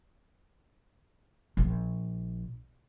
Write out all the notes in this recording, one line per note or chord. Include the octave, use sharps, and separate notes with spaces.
A#1